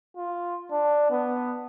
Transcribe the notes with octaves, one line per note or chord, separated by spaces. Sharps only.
F4
D4
B3